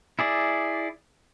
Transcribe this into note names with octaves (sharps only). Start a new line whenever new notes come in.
E4 G#4 D5